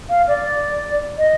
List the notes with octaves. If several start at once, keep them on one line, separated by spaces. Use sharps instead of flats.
F5
D5
D#5